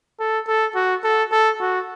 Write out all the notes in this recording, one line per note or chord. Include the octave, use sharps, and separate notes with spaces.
A4
A4
F#4
A4
A4
F#4